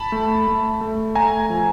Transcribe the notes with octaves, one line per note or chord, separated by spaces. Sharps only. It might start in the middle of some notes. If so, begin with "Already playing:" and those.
Already playing: A5 B5
A3
A3
A3
A3 G#5 A#5
F3